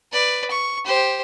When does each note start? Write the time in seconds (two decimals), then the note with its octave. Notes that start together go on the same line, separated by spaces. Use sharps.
0.12 B4 D5
0.51 C#6
0.85 G4 C5